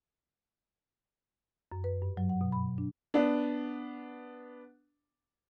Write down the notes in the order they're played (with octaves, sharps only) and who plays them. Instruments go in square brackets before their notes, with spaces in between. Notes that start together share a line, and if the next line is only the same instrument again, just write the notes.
[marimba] F#2
B4
G2
F#3
F#5
B2
B5
D4
[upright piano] B3 D4